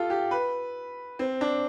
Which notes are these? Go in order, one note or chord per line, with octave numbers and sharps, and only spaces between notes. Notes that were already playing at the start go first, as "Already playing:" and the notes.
Already playing: F4 G4 A4
G4
B4
C4
D4